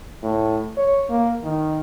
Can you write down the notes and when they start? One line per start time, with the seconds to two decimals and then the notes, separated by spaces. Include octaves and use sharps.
0.23 A2
0.77 C#5
1.10 A#3
1.44 D#3